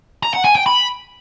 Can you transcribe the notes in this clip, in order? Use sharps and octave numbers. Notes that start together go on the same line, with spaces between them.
A#5
F#5
G#5
G5
B5